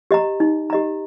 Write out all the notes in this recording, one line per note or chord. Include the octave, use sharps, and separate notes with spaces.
G4 D#5 A#5
D#4
G4 D#5 A#5